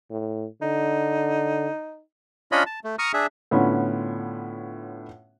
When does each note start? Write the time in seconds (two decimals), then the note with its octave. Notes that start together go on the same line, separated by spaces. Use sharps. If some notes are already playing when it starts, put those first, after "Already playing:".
0.10 A2
0.62 D3 D#4
2.52 C#4 D4 F4 C#5 D#5 B5
2.66 A5
2.84 A3
2.99 A#5 C#6 D#6 F6
3.13 D4 G#4 E5
3.51 A2 D3 B3 C#4 F4